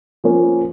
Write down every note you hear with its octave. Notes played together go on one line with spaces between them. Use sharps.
F3 A#3 C#4